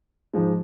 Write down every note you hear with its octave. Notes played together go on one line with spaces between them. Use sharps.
G#2 F3 G#3